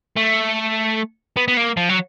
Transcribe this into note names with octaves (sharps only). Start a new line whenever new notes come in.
A3
B3
B3
A#3
F3
F#3